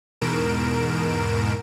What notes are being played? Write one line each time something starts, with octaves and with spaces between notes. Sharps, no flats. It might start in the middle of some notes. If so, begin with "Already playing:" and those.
E2 G#2 B2 A#4 D7 E7